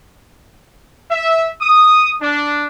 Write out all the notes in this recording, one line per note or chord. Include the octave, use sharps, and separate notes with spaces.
E5
D#6
D4